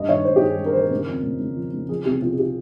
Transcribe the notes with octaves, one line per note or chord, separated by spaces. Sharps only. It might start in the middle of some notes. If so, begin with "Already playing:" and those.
Already playing: G2 D#5
D#3 C#5
G2 C5
G4
G2 G#4
G2
A#4
D#3 C5
A#4
C#3
F2
C#3
C#3
F3
C#3
F3 G#4
C2 G4
C2 F4
G#4
G4